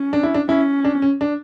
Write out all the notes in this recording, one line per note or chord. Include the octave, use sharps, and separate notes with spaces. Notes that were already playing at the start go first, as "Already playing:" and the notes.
Already playing: C#4
D4
E4
D4
C#4 E4
D4
C#4
D4